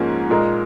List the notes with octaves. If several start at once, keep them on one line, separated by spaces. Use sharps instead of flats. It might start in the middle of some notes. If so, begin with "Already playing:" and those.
Already playing: G#2 F3 A#3 C#4 G#4
A#2 G#3 D#4 A#4